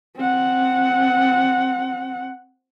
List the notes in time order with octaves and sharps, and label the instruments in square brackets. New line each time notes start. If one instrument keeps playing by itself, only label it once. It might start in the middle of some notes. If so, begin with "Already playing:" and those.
[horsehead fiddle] C4 F#5